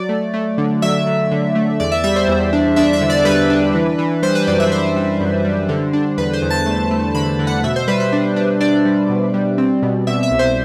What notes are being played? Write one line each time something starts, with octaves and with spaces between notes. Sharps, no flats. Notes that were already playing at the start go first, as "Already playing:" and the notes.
Already playing: F#3 D5
A3
A3
D3
F#3 E5
F#3
D3
A3
E2 D5
E5
G3 E5
C5
E2
D4
D4 E5
E5
D3
D5
G3 B4
D4
E3
E3
G3 C5
B4
F#2 D5
E5
F#2 C5
G3
F#2
G3
D3
D4
E2 B4
C5
E2
A5
A3
A3
D3 B5
D3
F#5
B2 E5
C5
G3 B4
C5
D4
D4
D4 D5
G3
B2
G3
C4
B2
B2 E5
E5
C2
C5